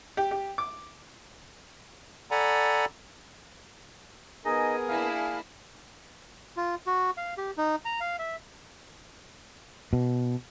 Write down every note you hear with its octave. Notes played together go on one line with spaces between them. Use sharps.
G4
G4
D6
A4 D5 F#5 G#5 A#5 B5
B3 D#4 G#4 A#4 D#5 G#5
A#3 D4 E4 F5
F4
F#4
F5
G4
D#4
A#5
F5
E5
B2